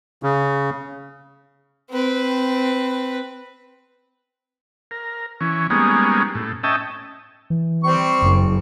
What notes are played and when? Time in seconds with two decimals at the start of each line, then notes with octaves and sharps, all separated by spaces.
0.23 C#3
1.90 C4 B4
4.91 A#4
5.41 E3 C#4
5.70 G3 G#3 A#3 B3 C#4 D#4
6.35 A2
6.63 C#4 D#5 E5 G5 A5
7.50 E3
7.84 G3 C4 C#6
8.22 F#1 F#2